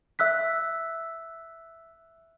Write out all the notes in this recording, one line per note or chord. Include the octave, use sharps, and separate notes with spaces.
E5 E6 F#6 B6